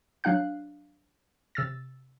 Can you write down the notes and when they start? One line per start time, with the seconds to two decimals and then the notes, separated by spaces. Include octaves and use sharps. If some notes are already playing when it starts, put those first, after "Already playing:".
0.24 F#3 D4 F5 F#6
1.55 C3 E6 A6